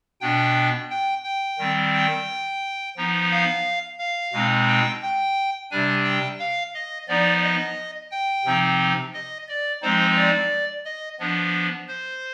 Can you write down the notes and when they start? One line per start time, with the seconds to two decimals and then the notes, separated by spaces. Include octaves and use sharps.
0.21 B2 B3 D4 G5
0.91 G5
1.24 G5
1.58 D#3 G3 C4
1.94 G5
2.97 F3 B3 D#4
3.31 F5
3.98 F5
4.33 B2 G#3 C4 D#4
4.68 G5
5.02 G5
5.71 C3 G3 D4 G#5
6.04 G5
6.39 F5
6.74 D#5
7.08 F3 B3 D#4 D5
7.43 D#5
8.11 G5
8.45 C3 F3 C4 D#4
9.14 D#5
9.48 D5
9.82 F3 G#3 C4 D#4 C5
10.16 D5
10.85 D#5
11.19 F3 B3 D4
11.88 C5